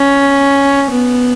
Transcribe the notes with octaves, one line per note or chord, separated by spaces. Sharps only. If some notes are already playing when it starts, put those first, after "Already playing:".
Already playing: C#4
B3